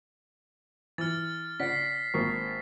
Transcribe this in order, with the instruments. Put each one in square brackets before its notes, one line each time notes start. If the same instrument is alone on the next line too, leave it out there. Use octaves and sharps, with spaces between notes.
[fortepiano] E3 [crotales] F6 A6
[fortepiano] C#3 D5 F#5 [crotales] B6 C7
[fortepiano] G#1 A#3 C#6